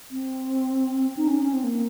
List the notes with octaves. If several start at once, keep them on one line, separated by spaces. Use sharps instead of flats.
C4
D#4
C#4
C#4
C4
A#3